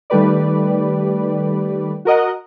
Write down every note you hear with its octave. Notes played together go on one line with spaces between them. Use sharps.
D#3 G3 A3 G4 B4 D5
F#4 A#4 D#5 F#5